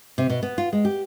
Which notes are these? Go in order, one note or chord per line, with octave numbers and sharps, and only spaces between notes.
C3
B2
B3
F4
G#3
G4